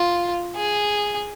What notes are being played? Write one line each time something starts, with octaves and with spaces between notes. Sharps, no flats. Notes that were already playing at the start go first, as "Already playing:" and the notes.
Already playing: F4
G#4